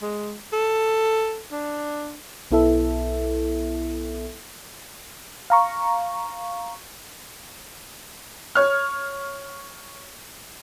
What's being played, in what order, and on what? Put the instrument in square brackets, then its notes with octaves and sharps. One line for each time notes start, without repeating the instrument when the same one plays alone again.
[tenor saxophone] G#3
A4
D4
[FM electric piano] B1 B3 E4 A4 E5
F5 A#5 C#6
[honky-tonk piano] C#5 F6